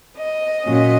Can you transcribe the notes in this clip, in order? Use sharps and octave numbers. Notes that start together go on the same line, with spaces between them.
D#5
A#2 F#3 C#4